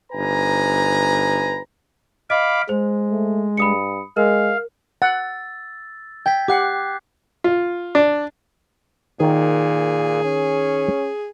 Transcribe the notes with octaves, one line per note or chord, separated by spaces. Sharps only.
G1 D#4 B4 G#5 A#5
D#5 F5 B5 D6
G#3 C5
A3
G2 B5 D#6 C#7
G#3 A#4 F5
F#5 E6 A6
G5 G6 G#6 B6
G4 F#5 D6 F#6 C7
F4
D4
A#2 D#3 G#4
C#4